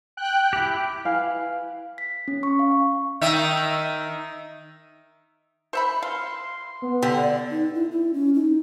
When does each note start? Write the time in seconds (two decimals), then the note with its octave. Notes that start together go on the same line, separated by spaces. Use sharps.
0.17 G5 F#6
0.53 E4 G4
1.05 E4 B4 F5 G#5
1.98 B6
2.28 C#4
2.43 C#6
2.59 F5
2.71 C#6
3.21 D#3 E5
5.73 C5 E5 B5 C#7
6.03 F5 C6
6.82 B3
7.02 D3 G4
7.51 D#4
7.74 E4
7.91 E4
8.14 C#4
8.34 D#4